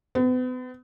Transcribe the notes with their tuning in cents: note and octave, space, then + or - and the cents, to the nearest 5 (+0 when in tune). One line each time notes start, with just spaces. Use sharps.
B3 +40